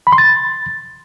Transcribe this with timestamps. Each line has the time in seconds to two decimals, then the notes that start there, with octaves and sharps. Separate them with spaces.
0.07 B5
0.12 C6
0.18 A6